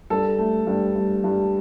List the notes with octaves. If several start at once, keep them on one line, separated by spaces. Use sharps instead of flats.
G2 A4
A3
G2
G2
G2